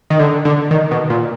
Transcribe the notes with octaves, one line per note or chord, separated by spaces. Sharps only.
D#3
D3
D3
D#3
B2
A#2